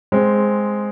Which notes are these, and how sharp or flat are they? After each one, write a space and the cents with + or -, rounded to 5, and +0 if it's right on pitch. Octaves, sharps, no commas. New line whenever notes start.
G#3 +0 C4 +0